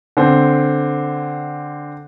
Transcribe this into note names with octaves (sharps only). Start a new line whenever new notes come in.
D3 C4